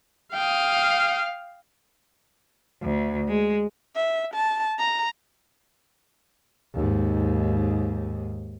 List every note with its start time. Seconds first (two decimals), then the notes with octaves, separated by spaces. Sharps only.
0.34 F5 G5 D#6
2.82 D2
3.29 G#3
3.96 E5
4.34 A5
4.79 A#5
6.74 D#2 G#2